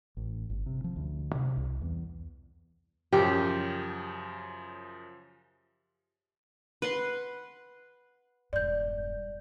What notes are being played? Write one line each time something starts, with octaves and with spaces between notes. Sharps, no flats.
A1
G1
C3
F3
D2
C3
C2
E2
F#2 C#3 F3 G4
B4 F#5 C6
E1 G2 D5 G6